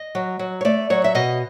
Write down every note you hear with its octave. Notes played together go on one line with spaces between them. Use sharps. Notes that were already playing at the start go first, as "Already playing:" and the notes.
Already playing: D#5
F#3
F#3
C#5
A3 D5
F#3 C#5
E5
B2 D#5